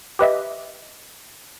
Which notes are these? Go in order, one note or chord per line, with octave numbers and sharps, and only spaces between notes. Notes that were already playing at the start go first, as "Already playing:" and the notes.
G4 B4 D#5 E5